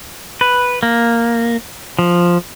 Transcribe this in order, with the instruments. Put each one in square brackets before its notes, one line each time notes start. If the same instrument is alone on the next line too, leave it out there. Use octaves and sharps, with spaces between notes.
[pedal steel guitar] B4
A#3
F3